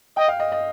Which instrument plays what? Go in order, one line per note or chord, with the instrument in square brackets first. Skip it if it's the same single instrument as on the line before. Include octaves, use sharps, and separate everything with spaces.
[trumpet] D#5 [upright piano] G5
[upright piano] F5
D#5
D#5